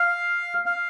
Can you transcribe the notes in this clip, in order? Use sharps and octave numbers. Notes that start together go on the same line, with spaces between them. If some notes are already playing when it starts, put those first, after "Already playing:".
Already playing: F5
F5